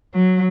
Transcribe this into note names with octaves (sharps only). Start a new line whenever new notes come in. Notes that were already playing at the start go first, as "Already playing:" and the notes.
F#3